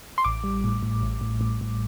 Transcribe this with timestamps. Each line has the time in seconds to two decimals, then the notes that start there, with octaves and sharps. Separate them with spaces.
0.18 C6
0.24 A1 D6
0.44 G3
0.64 A2
0.83 A2
1.03 A1
1.21 A2
1.41 A2
1.61 A2